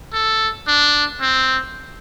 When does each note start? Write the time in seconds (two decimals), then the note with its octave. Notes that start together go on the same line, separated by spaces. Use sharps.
0.13 A4
0.67 D4
1.21 C4